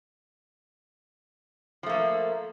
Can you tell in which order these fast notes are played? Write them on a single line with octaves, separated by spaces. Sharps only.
F3 A3 A#3